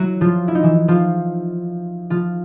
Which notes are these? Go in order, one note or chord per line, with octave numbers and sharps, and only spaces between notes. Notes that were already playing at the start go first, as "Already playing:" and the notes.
Already playing: F#3 E4 F#4
F3 F4
E4
D#4
E3 E4
F3 F4
F3 F4